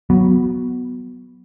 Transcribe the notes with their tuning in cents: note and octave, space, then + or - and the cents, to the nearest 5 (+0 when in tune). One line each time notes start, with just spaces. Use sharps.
F#3 +0 B3 +0